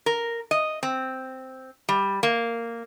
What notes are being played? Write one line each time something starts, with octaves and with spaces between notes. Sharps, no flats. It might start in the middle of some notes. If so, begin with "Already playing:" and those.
A#4
D#5
C4
G3
A#3